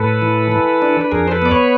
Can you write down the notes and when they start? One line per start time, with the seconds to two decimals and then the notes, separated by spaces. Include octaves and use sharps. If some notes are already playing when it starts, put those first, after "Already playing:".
Already playing: A2 A4 B4
0.22 E3
0.52 E3
0.82 D4
1.01 B4
1.12 F2 G#4 A#4
1.28 C5
1.31 A4 B4
1.42 B3 D5
1.51 B4 C#5